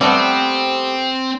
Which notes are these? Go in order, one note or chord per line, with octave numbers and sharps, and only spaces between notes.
G3 A3 B3 C4